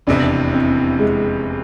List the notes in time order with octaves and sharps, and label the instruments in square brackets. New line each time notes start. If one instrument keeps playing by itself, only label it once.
[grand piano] F1 E2 C3 [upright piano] D4
[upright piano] C4
G#3